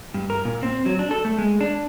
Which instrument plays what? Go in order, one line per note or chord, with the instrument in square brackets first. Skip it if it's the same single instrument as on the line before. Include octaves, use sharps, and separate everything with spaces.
[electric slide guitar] G2
A#4
A#2
C4
F#3
D4
A4
A3
G#3
D4